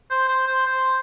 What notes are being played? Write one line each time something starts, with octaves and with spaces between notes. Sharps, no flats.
C5
C5
C5
C5